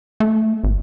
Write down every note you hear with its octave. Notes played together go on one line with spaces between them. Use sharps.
A3
G#1